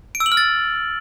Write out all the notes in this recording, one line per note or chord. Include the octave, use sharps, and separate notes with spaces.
D7
E6
F#7
F6
A6